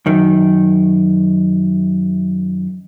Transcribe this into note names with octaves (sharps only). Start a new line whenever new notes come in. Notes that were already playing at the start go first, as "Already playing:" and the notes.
F#2 D#3